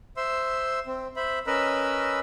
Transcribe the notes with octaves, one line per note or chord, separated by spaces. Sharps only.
C5 E5 C6 E6
C4
C5 E5 B5
C#4 A#4 B4 D#5 B5 E6